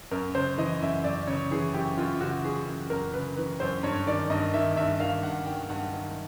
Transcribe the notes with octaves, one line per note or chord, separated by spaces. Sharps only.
F#2 A#4
C#3 C5
E3 D#5
F#2 E5
F#2 D5
C#3 C#5
E3 G#4
F#2 G4
F#2 F4
C#3 F#4
E3 G#4
F#2
F#2 A#4
C#3 B4
E3 B4
F#2 C5
G2 C#5
D#3 D5
G2 D#5
D#3 E5
G2 E5
D#3 F5
G2 F#5
D#3 G5
G2 F#5
D#3